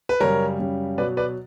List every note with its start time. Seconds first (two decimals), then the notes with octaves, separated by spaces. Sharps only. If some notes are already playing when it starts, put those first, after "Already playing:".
0.09 B4
0.20 F#2 C#3 G3 A#4 C#5
0.59 F#2 C#3 G3
0.98 B2 F#3 B4 D5
1.17 B4 D5